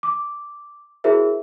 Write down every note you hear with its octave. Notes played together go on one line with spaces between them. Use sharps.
D6
E4 F#4 G#4 A#4 C5 E5